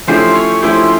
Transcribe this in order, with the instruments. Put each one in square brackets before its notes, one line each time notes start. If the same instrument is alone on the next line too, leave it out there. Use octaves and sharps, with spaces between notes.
[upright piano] F3 A3 C#4 E4 G4 [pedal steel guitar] C5
[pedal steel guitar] C#5
[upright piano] F3 A3 C#4 E4 G4 [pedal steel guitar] C5